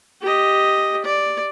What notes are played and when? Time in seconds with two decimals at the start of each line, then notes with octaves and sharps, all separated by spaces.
0.21 G4 D#5
1.04 D5